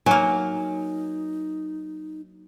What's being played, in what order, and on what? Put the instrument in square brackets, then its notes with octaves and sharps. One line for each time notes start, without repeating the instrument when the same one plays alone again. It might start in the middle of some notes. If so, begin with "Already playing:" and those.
[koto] F#3 A#3 [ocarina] D#4 [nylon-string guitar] G#5